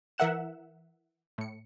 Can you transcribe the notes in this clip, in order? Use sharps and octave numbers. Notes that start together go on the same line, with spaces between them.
E3 A#4 E5 F#5 F#6 E7
A2 C#7